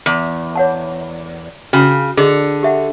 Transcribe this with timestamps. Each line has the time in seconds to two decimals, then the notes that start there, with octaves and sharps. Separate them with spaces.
0.06 E2
0.55 C#5 F#5 A5
1.73 C#3 F#4 G5
2.17 D3 G#4 D#5
2.63 G4 E5 F#5